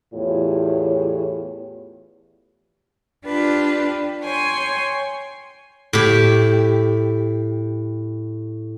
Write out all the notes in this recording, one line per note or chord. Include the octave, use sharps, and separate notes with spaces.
E2 A2 F4 G4 C#5
D4 F4 G4 B4
C#5 G5 G#5 C6
A2 G4